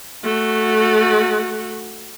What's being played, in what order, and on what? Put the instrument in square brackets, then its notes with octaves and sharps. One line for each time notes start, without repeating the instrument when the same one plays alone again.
[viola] A3 F#4